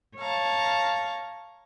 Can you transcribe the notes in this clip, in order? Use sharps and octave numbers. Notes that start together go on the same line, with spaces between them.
C#5 F5 A5 A#5